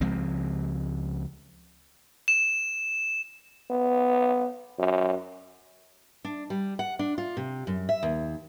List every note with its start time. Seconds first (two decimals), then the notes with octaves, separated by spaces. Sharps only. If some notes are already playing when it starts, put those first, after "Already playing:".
0.01 C#2 F3 G#3 C4
2.28 E7
3.70 B3
4.79 F#2
6.25 D4
6.50 G3
6.79 F#5
6.99 D4
7.18 F4
7.37 C3
7.67 F#2
7.89 E5
8.03 D#2